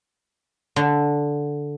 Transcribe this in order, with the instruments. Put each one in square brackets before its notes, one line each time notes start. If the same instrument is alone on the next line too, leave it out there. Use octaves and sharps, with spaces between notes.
[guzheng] D3